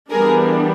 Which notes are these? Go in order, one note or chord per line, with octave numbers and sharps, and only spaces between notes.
E3 G3 B3 D4 G#4 A#4